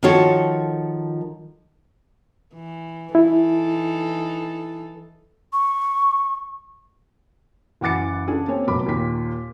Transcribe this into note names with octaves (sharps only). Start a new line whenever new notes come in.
D#3 F3 F4 F#4 A4 C#5
E3
E3 D#4 E4 A4
C#6
F#1 E3 F#5 D6 A6 C#7
C#3 D4 G#4 A4
A#3 C4 C#5 G#5
F1 B2 F#3 B5 D6
D#2 A#2 D#3 B6